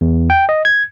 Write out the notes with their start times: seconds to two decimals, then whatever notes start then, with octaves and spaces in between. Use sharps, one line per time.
0.01 E2
0.30 G5
0.49 D#5
0.65 G#6